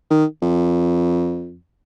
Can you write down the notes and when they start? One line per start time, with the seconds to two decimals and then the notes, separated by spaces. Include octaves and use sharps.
0.10 D#3
0.42 F2